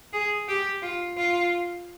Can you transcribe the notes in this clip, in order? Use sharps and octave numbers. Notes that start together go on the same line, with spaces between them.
G#4
G4
F4
F4